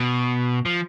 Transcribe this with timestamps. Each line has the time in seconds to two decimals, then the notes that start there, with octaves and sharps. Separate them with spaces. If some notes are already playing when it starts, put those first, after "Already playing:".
Already playing: B2
0.66 F3